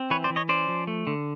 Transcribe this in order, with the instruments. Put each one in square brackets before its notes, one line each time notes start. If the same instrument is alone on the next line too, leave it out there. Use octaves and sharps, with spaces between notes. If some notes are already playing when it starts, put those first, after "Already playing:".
Already playing: [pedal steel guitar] C4
E3 B4 C#5
C5 D5
E3
C#5 D#5
C#4 C5 D5
F3
A3
D3